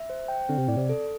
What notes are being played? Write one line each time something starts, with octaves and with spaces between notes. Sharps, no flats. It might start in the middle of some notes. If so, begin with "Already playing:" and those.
Already playing: E5
C5
G5
D3 C4
C3
A2 D5
C3
A4